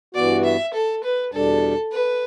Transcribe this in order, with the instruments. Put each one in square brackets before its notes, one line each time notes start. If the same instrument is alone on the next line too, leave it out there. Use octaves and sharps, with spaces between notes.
[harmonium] G2 E3 B3 F#4 [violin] D5
[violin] E5
A4
B4
[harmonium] E2 B2 G3 D4 [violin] A4
[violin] B4